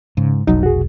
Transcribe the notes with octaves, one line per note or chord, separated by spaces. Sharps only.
G#2 C#3
F1 B1 F#3 D#4
F#4 G#4